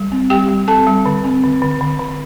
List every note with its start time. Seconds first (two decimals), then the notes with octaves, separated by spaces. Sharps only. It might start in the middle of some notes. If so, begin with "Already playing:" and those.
Already playing: G3
0.12 C4
0.30 G3 G4 G5
0.48 G3
0.68 C4 A4 A5
0.87 G3
1.06 D3
1.24 C4
1.43 D3
1.62 D3
1.81 D3
1.99 D3